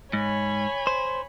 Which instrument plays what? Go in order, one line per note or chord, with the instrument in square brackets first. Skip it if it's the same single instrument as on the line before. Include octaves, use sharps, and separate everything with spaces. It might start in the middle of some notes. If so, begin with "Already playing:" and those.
[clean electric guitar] G#2 [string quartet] C#5 G#5 B5
[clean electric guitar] C5